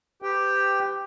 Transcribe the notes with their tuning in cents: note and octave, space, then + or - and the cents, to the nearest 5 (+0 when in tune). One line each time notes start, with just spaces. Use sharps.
G4 +5 B4 +40 G5 +0